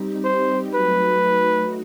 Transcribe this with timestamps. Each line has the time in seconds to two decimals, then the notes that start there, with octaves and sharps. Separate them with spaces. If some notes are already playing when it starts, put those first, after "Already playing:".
Already playing: G3 C4 D#4 G4
0.24 C5
0.74 F#3 A3 D#4 F#4 B4